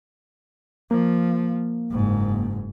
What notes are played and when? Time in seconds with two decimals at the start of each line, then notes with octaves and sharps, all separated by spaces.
0.91 F3 A#3
1.91 F#1 G#2